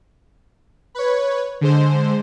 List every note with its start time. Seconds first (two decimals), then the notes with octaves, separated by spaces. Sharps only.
0.95 B4 C#5
1.61 D3 G#3 C5